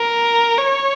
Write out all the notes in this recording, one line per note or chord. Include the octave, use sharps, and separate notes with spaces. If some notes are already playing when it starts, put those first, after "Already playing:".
Already playing: A#4
C#5